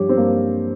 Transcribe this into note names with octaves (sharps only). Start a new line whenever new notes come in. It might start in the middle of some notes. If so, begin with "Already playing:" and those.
Already playing: G2 F3 G4 C#5
C4
G2 A#3